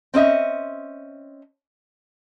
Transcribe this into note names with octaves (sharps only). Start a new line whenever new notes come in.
C4 C#4 D#5 E5